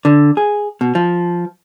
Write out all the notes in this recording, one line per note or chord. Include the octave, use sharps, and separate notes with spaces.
D3
G#4
B2
F3